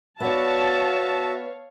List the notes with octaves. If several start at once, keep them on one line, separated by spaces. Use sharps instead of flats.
B3 F#4 C#5 D5 E5 F5 A5